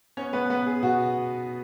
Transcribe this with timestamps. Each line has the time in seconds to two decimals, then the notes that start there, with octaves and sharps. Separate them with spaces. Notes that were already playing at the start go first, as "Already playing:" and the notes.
0.17 B3 C#4 C#5
0.33 B3 B4
0.50 B3 B4
0.66 G#4
0.83 B2 F#4